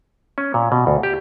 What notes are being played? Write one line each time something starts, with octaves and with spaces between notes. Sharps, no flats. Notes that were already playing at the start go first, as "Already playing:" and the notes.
C#4
A#2
B2
D2
G4